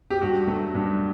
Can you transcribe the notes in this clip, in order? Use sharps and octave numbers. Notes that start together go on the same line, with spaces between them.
G4
G2 F#4
F#3 A3
G2